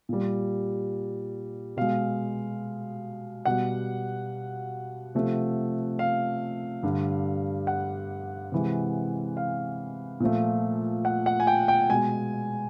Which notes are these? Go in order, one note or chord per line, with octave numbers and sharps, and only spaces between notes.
A#2 G3
B2 G#3 F5
B2 G3 F#5
C3 F3 A3
F5
G2 D3 G3
F#5
C3 E3 G#3
F5
A#2 F3 A3
F#5
F#5
G#5
G5
G5
B2 G#3 G#5